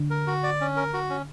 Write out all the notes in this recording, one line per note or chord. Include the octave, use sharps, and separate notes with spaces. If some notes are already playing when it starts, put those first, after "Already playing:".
Already playing: D3
A#4
F#4
D5
C#4
A#4
F#4
C#4